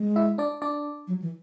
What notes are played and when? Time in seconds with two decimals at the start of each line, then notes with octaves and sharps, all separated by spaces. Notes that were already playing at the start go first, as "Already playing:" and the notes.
Already playing: G#3
0.16 E4 E5
0.38 D4 D5
0.62 D4 D5
1.07 F#3
1.22 E3